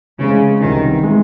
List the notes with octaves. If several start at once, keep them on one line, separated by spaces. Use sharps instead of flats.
C#3 E3 G#3 C4
C2 C3 D#3 E3 C4
E3 G#3